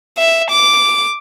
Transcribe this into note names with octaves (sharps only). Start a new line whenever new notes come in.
E5
D6